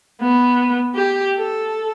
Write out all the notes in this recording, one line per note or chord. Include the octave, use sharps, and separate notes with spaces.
B3
G4
A4